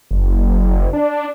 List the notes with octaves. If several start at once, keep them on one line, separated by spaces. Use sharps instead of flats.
F#1
D4